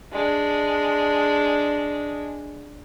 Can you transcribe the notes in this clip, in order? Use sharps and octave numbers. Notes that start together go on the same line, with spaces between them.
G#3 D4